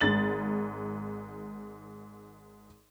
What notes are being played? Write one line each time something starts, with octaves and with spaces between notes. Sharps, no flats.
G#1 G#2 A6 F#7